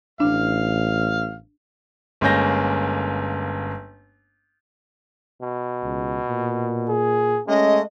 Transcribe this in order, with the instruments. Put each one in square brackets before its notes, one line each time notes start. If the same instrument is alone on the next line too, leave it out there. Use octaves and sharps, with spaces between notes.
[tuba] A1 [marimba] D4 [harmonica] F5
[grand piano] G1 G#3 A#3 C#4 G6 A#6
[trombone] B2
[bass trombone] C#2
A#2
[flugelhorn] G#4
[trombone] G#3 [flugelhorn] A3 [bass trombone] C#4 [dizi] D#5